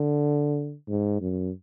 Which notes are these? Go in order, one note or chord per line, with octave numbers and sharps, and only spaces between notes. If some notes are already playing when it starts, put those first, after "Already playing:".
Already playing: D3
G#2
F#2